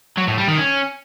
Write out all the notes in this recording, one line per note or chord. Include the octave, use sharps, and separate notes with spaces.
F#3
A2
G3
D#3
C#4